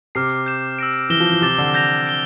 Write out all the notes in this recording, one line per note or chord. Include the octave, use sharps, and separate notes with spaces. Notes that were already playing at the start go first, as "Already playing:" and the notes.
C3 D6 F6 C7
G6 C7 E7
E6 A#6 D7
E3 F6 A#6 E7 G7
F3
E3
C3 D6 A6 E7 G7
D3
G6 A#6 F7
G6 D7 G7